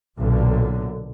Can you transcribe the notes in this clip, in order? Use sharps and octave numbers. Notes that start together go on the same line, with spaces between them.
B1 A#2 D3